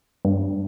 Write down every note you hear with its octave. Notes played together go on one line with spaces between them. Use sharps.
G2